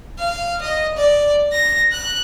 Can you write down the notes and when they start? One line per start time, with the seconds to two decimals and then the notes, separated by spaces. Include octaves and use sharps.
0.19 F5
0.62 D#5
0.97 D5
1.52 A#6
1.93 F#6